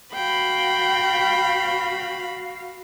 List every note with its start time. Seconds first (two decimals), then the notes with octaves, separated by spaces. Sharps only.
0.14 F#4 F5 G5 B5